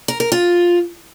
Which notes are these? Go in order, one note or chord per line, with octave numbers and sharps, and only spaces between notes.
A#4
A#4
F4